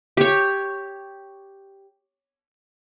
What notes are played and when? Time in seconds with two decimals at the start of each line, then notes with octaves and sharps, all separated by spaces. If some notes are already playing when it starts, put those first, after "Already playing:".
0.17 G4 C#5